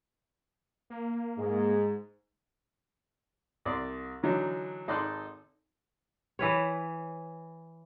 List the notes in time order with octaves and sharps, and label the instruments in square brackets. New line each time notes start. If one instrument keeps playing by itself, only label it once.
[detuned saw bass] A#3
[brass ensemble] G#2 G#3
[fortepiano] C2 D5 C6
D3 E3 F#3 D4 D#4
G#1 D#4 A4 D5 C6 F#6
[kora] E3 B4 C#5